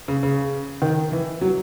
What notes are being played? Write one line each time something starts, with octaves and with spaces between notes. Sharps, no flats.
C#3
C#3
D#3
E3
F#3